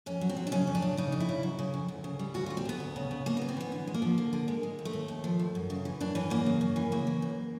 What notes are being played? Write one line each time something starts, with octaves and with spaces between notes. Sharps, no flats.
F2 C#4
F#3
C4
F#3
D4
C#3 C#4
F2
D4
C#3
C#3 D#4
F2
E4
C#3
F#3
C#3
F2
D2
C#3
G3
D2 F#4
D2 F4
C4
D2 B3
D2
C#3
C#3
C#3 A#3
E3 B3
C4
E3 B3
D3
G#3
A#3
F3
D3
D3
G#3
G#3
D#2
A3
D#2
D#2
F3
D#2
F#2
C#3
E3
F#2 D4
E3 C#4
F#2 A#3
C#3
F#2
E3
C#3 A#3
E3
F#2